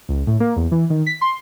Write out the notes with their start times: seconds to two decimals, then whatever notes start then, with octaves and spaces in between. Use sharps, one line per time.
0.09 C#2
0.27 A2
0.40 A#3
0.56 E2
0.71 E3
0.90 D#3
1.06 B6
1.21 C6